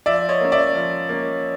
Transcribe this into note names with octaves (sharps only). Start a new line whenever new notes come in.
F3 D5 E5
C#5 D#5
A#3 C#4
D5 E5
F3
A#3 C#4